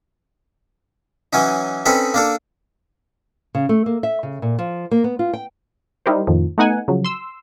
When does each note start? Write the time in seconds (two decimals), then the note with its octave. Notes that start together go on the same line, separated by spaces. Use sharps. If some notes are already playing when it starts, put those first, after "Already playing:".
1.33 E3 F#3 C#4 D#4
1.86 C4 C#4 D#4 A4 B4
2.14 A#3 D4 A4
3.55 C#3
3.69 A3
3.86 A#3
4.03 E5
4.23 C#3
4.42 A#2
4.59 F3
4.91 A#3
5.04 B3
5.19 F4
5.33 G5
6.06 G3 D#4 E4 G4 A#4 C5
6.27 F2 A2 D#3 F3
6.58 A3 B3 D#4 F#5 G#5
6.88 C#3 F3 F#3
7.05 C6 E6